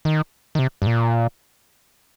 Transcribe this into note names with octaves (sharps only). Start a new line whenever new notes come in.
D#3
D#3
C3
G2
A#2